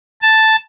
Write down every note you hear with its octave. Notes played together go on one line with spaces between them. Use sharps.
A5